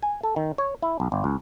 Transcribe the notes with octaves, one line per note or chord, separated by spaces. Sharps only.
G#5
A4
D#3
C#5
E4
B1
G1
C#2